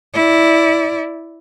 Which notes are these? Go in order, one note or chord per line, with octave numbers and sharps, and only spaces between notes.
E4 D5